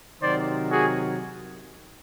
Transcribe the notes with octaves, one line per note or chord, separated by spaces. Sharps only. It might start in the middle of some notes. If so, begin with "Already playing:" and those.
C3 D#3 F#3 C5 D5
F#4 G#4